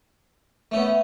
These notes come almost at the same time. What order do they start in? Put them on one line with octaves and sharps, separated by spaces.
A3 C#4 B3